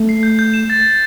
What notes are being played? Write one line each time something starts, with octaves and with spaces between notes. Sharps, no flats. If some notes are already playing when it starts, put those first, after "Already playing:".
Already playing: A3
C7
G6
G6
E7
A6
A6